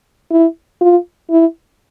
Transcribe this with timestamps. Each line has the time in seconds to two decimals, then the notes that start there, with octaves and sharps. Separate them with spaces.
0.31 E4
0.81 F4
1.30 E4